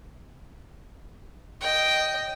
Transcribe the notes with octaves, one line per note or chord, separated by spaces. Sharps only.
D#5 G5